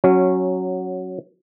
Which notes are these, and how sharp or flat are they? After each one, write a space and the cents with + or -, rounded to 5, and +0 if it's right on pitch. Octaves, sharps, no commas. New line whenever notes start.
F#3 +0 C#4 -10